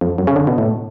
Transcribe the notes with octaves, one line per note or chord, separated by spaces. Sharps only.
F2
F#2
C#3
D3
B2
A2